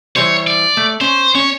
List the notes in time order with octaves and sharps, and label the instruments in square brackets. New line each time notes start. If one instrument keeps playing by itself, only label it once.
[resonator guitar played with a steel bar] E3 G3 C5 [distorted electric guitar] C#5
[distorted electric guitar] D5
[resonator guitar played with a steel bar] A3
[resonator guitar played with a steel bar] C#4 [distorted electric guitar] C5
[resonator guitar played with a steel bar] C#4 [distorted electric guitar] C#5